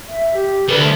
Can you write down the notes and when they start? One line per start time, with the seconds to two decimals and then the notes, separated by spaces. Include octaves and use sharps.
0.09 E5
0.34 G4
0.69 D3 A3 B4
0.80 A5